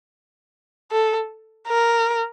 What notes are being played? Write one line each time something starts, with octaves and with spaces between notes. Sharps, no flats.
A4
A#4